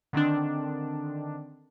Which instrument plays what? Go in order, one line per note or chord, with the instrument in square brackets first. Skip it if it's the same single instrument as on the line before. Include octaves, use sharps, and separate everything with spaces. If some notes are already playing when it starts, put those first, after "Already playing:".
[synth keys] D3 D#3 C4 D4